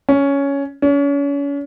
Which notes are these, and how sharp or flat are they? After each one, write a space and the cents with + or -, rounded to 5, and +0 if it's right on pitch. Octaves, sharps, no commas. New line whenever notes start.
C#4 +10
C#4 +35